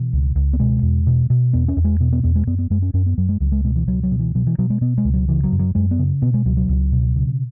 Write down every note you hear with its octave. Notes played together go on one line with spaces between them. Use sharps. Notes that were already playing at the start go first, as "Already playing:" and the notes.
Already playing: B2 E3
C#2
C#2
B3
B2 G#3
E2
B2
B2
E2 B3
C#4
E2
G#3
B2 B3
B3
E2 B3
G#3
F#2 B3
B3
F#2 G#3
C#4
F#2 C#4
B3
F#2 F#3
G#3
C#2 F#3
G#3
B2 G#3
E3
C#2 F#3
F#3
B2
E3
B2 F#3
E3
B2 F#3
G#3
B2 B3
G#3
C#2
F#3
C#3 E3
F#3
F#2
F#3
F#2 G#3
B3
C#3
B2 B3
G#3
C#2 F#3
F#3
C#2
B2
C#3